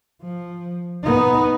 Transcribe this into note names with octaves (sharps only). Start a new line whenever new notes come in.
F3
B3 D#4